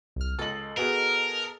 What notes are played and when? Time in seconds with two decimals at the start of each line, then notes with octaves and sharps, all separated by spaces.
0.16 C2 F6
0.39 C#2 A4 D#5 F#7
0.77 B3 F#4 G#4 A#4